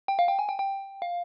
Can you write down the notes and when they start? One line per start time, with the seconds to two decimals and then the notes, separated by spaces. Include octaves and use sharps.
0.08 G5
0.19 F5
0.28 G5
0.39 G#5
0.49 G5
0.59 G5
1.02 F5